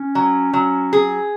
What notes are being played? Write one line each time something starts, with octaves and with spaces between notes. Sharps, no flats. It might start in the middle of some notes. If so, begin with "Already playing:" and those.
Already playing: C#4
F#3
F#3
G#4